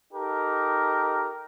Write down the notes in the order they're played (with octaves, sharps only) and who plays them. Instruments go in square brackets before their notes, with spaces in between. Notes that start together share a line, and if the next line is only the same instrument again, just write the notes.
[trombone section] D#4 G4 A4 A#4